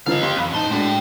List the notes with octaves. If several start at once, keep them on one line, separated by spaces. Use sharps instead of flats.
G1 C#3 F3 D#5 F5
G4 C6
F2 E3 C#4 B5 F#6
A2 D#4 C5 A5 C6
A2 G#3 D4 F#4 C#5 G5